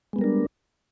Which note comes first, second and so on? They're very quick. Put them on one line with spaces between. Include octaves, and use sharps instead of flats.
G#3 B3 G3 A#4 D4